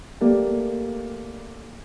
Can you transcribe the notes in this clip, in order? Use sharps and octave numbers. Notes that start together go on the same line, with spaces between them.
A3 A#3 G4 D5